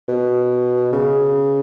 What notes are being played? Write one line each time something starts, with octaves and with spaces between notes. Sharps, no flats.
B2
C#3